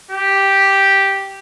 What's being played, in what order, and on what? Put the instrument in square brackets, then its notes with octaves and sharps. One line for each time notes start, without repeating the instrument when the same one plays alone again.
[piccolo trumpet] G4